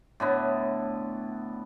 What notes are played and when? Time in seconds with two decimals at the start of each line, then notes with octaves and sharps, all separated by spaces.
0.20 A2 D3 B3